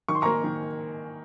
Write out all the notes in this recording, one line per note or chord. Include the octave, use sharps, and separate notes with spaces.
D#3 C#6
C6
A#3 A#5 C#6
D#3